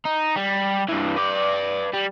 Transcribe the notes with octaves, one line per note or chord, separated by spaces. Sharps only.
D#4
G3
G2 E3
B4 D5
G3